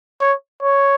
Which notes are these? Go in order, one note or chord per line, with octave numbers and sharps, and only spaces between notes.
C#5
C#5